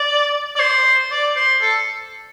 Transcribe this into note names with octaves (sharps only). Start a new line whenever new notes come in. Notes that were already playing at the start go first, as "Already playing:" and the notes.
Already playing: D5
D5
C5
D5
C5
A4